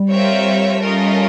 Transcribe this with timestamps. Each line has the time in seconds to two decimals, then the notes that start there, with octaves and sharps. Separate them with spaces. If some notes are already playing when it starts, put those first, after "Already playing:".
Already playing: G3
0.11 C4 F4 A#4 C#5 E5
0.82 A3 C#4 F4 A#4 D#5